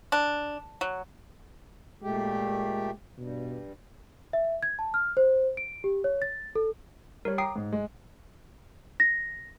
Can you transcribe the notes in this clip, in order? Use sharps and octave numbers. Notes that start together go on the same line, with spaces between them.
D4
F#3
A#2 G#3 A3 G4
G2 B2
E5
G#6
A5
F6
C5
D7
G4
C#5
A6
A4
G3 A#4 C#5
G5 A#5 D6 D#6 C7
G#2
G#3
A#6